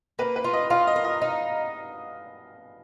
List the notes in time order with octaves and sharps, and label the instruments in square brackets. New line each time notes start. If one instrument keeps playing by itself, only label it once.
[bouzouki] A#3 [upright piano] B4
[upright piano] B4
[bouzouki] F4
[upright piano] D#5
[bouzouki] F4 [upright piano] F5
[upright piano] D#5
[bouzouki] A#4
[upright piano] D#5
[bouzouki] D#4